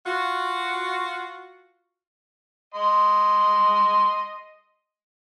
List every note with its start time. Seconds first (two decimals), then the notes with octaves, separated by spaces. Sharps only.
0.05 F4 F#4
2.75 D#5 C6